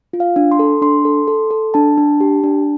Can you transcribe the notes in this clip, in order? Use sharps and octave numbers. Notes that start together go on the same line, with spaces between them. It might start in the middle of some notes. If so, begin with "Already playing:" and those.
F4
F5
D4
C6
A4
D4 C6
A4
A4
A4
D4 A5
D4
G4
D4